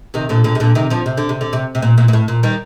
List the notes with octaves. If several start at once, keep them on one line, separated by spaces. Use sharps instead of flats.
C3 D#3
A#2 D3
A#2 D3
C3
A#2 D3
C3 D#3
D3 F3
C3
D3
C3
D3
C3
C3
A#2
A#2
A#2
A2
A#2
D#3 G3